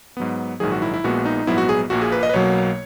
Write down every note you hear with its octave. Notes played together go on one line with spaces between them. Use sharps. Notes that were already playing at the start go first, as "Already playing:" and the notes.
G#2 F#3 B3
A#1 G#2 D#3 F#3 G#4
F#4
E4
E4
A#1 A#2 G#3 B3 F#4
D#4
A#1 G#2 F#3 B3 E4
F#4
G#4
A#1 A#2 A#3 F#4
G#4
B4
D#5
B4
B1 B2 F#3 A#3 C#5